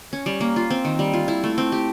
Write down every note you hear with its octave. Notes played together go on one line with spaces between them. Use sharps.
C#4
G3
A#3
F4
C4
D#3
G3
F4
E4
A3
C4
G4